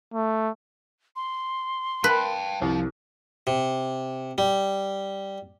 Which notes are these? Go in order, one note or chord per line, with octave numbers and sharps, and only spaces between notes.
A3
C6
B4 G5 A5
C2 F3
C3
G3